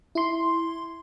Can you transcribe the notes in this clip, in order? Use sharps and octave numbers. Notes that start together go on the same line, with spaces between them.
E4 C6